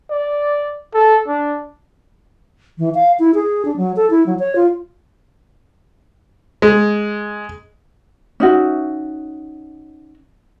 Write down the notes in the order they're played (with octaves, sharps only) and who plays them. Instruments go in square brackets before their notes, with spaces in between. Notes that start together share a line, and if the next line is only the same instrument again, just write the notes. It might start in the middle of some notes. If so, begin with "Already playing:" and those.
[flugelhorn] D5
A4
D4
[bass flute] E3
F5
E4
G#4
D4
F#3
A4
E4
F#3
C#5
F4
[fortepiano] G#3
[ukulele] C#4 D#4 F#4 E5